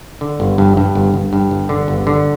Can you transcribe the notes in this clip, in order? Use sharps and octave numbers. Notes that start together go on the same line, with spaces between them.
D3
G1
G2
G2
G1
G1
G2
G1
D3
G1
D3